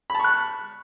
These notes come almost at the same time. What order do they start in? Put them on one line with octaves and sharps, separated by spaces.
B5 A5 C#6 F#6